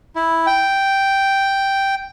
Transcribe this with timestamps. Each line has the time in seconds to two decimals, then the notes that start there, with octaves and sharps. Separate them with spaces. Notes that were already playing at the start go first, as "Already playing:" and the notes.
0.16 E4
0.47 G5